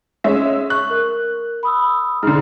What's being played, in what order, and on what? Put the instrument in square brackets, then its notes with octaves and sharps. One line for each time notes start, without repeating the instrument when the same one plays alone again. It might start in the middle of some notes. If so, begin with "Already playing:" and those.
[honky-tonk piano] G#3 C#4 E5
[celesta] C#6 [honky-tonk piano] F#6
[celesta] A#4
B5 D#6 E6
[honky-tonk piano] G#2 D3 [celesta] F6